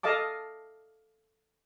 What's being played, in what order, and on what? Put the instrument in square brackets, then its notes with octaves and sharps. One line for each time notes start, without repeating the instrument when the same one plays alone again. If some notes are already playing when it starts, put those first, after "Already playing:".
[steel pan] A4 D#5 F5 A5 D6